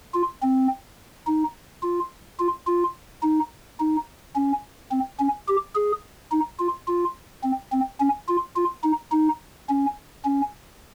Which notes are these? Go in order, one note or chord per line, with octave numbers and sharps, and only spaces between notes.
F4
C4
D#4
F4
F4
F4
D#4
D#4
C#4
C4
C#4
G4
G#4
D#4
F4
F4
C4
C4
C#4
F4
F4
D#4
D#4
C#4
C#4